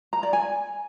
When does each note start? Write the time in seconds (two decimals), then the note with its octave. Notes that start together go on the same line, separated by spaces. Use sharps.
0.13 A#5
0.23 D5
0.33 G#5